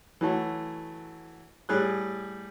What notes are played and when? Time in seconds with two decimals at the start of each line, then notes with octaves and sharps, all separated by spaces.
0.21 E3 F#3 A3
1.69 A2 G3 G#4 F#6